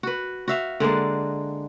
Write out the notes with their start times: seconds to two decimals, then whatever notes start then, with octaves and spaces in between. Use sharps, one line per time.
0.03 F#4 B4
0.48 F#4 E5 F5
0.80 D3 G#3 A#3 D4